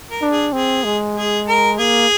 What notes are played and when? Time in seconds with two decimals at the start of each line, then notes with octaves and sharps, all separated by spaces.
0.10 A#4
0.22 D4
0.32 G#4
0.53 C4 G#4
0.84 G#3
1.17 G#4
1.48 A#4
1.78 A#3 G#4